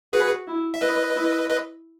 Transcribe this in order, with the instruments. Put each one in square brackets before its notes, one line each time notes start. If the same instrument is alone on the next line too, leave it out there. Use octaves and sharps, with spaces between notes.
[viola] F#4 [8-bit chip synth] G#4 B4
[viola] E4
[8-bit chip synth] E5
[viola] E4 [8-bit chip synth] B4 D#5
[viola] E4
[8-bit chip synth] B4 D#5